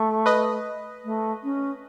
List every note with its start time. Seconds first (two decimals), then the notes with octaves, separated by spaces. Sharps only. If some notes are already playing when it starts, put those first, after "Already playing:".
Already playing: A3
0.26 B4 D#5
1.04 A3
1.43 C#4